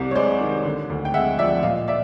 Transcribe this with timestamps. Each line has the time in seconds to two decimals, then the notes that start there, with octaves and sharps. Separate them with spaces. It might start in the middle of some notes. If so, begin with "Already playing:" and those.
Already playing: C2 C3 D5
0.11 C#5
0.15 G#3 C5 D5
0.41 D#3
0.65 D3
0.90 D2
1.05 G5
1.14 G#3 E5 F#5
1.38 F3 D5 E5
1.63 A#2 D#5 F5
1.88 D5 E5